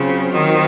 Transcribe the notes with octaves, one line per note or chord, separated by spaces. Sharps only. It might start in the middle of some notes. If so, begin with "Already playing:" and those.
Already playing: C#3 F#3 C4 F4 C5
D#3